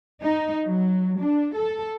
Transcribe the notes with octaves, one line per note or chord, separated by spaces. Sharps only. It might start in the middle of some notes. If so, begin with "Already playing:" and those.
D#4
F#3
D4
A4